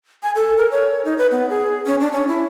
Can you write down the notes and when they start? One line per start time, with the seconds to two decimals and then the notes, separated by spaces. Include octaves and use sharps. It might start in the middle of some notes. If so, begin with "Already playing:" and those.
0.23 G#5
0.35 A4
0.58 A#4
0.71 C#5
1.05 D#4
1.18 B4
1.31 B3
1.49 G#4
1.86 C#4
2.00 D4
2.12 C#4
2.28 E4